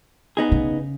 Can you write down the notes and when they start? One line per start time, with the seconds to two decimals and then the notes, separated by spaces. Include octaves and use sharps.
0.37 B3 D#4 G#4
0.52 C#3